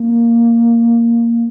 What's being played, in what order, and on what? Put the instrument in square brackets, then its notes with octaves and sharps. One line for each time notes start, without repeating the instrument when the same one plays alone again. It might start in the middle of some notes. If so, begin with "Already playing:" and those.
Already playing: [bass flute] A#3